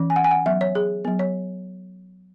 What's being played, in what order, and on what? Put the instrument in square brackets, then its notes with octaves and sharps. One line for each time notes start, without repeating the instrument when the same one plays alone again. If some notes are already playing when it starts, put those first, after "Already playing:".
Already playing: [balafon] E3 C#4
G#5
F#5
G#5
F#5
F#3 B3 E5
C#5
G#4
F#3 B3
C#5